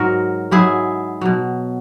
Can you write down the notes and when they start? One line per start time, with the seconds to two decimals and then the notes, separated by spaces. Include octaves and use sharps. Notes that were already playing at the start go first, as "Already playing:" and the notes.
Already playing: G#2 F#3 F#4 A#4
0.51 G#2 F#3 E4 G#4
1.21 B2 F#3